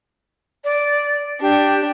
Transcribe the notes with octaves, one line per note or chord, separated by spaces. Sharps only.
D5
D4 G4